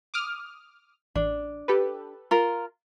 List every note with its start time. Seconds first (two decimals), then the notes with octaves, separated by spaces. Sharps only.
0.14 D6 D#6 F6
1.15 A1 D4
1.68 G4 A4 B4
2.31 F4 A#4